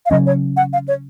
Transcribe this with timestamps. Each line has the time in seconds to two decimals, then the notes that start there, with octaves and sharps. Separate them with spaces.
0.06 F5
0.11 C#3 F#3 C#4 D#5
0.26 C#5
0.57 F#5
0.73 F5
0.88 C#5